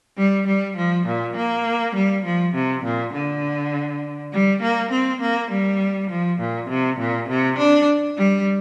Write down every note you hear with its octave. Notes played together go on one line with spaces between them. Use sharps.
G3
G3
F3
A#2
A#3
G3
F3
C3
A#2
D3
G3
A#3
C4
A#3
G3
F3
A#2
C3
A#2
C3
D4
G3